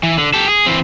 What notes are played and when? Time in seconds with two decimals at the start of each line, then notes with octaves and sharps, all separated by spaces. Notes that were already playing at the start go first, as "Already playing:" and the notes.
0.03 E3
0.18 D3
0.34 G4 A4
0.48 G#4
0.66 E3 C4